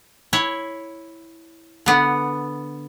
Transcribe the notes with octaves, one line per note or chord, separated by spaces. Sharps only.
E4 C#5
D3 B3